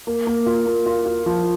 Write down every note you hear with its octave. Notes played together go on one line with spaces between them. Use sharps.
A#3
A#3
F4
A#3
F4
F4
F3